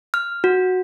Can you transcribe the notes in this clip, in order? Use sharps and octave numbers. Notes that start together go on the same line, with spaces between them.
F6
F#4